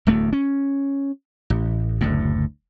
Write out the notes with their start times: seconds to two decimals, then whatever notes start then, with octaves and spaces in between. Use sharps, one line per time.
0.07 D1 E2 A3
0.33 C#4
1.50 A1
2.01 F#1 D2 A2